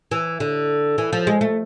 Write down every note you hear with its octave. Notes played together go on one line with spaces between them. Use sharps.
E3
D3
E3
F3
G#3
A3